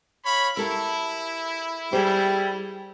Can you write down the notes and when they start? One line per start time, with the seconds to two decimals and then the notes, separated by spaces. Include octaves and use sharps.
0.25 C#5 F5 B5
0.57 E4 G4 A4 A#4
1.93 G3 G#4 C5